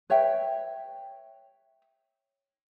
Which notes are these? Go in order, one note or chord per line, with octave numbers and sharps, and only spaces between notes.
B4 C#5 E5 G5